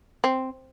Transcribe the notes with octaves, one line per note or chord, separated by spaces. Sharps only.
C4